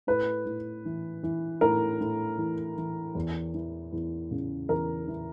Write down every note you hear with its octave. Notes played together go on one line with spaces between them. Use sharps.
A2 B4
A2
E3
E3
A2 A#4
A2
E3
E3
E2
E3
E2
C#3
E2 A#4
E3